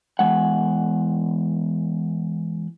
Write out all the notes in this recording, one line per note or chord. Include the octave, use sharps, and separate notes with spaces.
E2 G2 G#3 F#5